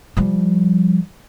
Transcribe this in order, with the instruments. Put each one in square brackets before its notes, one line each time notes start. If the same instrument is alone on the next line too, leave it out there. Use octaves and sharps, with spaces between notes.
[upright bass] F3 G3